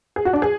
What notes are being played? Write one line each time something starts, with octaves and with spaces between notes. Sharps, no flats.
G#4
F#4
D4
G#4